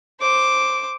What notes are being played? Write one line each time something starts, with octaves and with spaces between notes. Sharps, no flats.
C5 D6